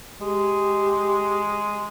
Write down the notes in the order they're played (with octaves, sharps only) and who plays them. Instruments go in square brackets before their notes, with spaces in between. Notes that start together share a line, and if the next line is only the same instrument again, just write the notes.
[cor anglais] G#3 [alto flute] G4